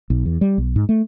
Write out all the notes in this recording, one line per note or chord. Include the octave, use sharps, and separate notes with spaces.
B1
E2
G3
B1
G#2
A3